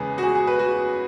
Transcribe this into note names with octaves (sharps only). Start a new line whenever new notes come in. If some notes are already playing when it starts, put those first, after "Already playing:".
Already playing: E2 C#3 G#3 B3 G#4
F#4
G#4
G#4
B4
F#4